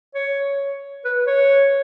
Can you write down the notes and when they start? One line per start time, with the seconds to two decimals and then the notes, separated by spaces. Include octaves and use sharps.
0.15 C#5
1.05 B4
1.27 C#5